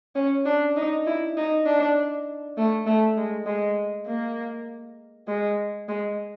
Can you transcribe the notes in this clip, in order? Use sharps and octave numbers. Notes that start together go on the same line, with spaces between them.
C#4
D4
D#4
E4
D#4
D4
A3
A3
G#3
G#3
A#3
G#3
G#3